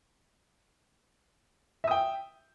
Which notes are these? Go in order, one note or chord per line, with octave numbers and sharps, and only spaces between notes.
E5 G5 D#6